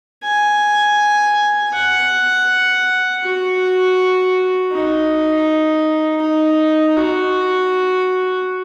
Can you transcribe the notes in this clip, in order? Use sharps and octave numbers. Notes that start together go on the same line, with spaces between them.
G#5
F#5
F#4
D#4
D#4
F#4